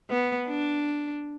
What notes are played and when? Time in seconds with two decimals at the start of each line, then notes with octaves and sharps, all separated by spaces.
0.10 B3
0.48 D4